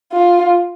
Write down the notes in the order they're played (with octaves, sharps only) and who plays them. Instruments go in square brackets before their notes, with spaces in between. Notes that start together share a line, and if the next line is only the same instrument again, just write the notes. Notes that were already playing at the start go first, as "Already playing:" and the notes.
[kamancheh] F4